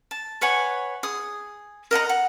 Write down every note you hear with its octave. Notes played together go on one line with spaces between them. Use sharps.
A5
B4 C#5 F#5 G#5
G#4 D#6
A#4 D#5 F#5 A#5
F#5